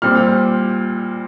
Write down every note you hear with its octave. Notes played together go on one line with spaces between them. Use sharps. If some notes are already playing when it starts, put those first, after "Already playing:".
A#2 G3 C4 F6